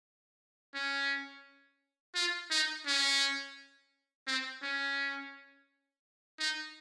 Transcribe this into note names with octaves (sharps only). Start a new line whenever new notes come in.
C#4
F4
D#4
C#4
C4
C#4
D#4